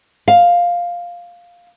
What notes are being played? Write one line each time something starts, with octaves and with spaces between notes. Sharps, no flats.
F5